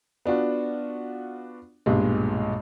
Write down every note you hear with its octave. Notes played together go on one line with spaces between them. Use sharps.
B3 D4 F4 F#4
B1 G2 A#2 G#3